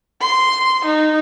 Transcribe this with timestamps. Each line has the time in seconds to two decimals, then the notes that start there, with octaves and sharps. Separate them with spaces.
0.21 C6
0.85 D#4